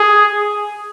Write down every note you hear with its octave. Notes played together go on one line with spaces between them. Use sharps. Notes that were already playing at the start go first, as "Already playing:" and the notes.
Already playing: G#4